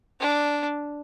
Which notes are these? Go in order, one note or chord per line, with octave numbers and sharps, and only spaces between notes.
D4